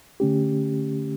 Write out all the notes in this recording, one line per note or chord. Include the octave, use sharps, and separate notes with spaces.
D3 A3 C#4 G4